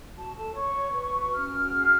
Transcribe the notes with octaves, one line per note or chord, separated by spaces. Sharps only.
F#4 A5
A4 A5
C#5 C#6
C#5
B4
F#4
C#4 F6
F#4
G#4